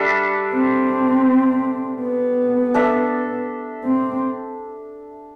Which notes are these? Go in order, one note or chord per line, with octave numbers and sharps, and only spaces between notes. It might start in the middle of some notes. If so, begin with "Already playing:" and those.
Already playing: G3 D4 A4 E5
C4
B3
D4 A4 E5
C4